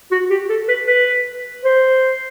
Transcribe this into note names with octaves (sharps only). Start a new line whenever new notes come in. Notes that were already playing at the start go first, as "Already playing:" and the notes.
F#4
G4
A4
B4
B4
C5